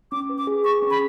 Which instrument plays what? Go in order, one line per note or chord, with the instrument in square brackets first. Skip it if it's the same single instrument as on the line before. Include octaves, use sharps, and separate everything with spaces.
[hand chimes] C#4 [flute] D6
[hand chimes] B4
[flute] D6
[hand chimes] G#4
[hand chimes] G#4 [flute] C#6
[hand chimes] C#4
[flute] B5